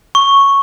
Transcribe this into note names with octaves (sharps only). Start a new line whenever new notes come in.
C#6